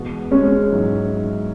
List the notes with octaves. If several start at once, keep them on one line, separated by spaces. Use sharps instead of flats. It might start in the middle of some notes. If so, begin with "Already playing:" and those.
Already playing: E2 B2 G#3 B3 F#4
G#3 C#4
G#2 F#3 E4